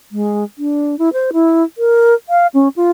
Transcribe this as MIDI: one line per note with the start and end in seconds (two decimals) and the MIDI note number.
0.12 0.44 56
0.58 0.98 62
0.99 1.09 64
1.13 1.30 72
1.33 1.64 64
1.78 2.14 70
2.29 2.47 77
2.54 2.68 61
2.76 2.91 65